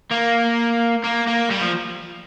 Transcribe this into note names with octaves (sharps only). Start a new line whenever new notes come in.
A#3
A#3
A#3
G3
F3